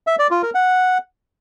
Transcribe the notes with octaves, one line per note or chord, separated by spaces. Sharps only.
E5
D5
F4
A#4
F#5